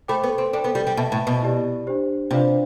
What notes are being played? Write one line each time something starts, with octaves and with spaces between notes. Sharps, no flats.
A3 C5 G5 B5 D6
B3
C4
D4 A4 C5 G5
B3
G3
G3
B2 B4 E5 A5
A2
B2
E4 G4 D5
D4 G4 C5
C3 D4 F4 B4 D5 F5